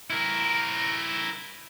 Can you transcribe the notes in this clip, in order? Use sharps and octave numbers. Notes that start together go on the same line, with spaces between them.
E4 A#4